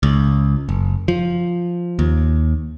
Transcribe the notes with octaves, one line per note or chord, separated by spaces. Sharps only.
C#2
F#1
F3
D#2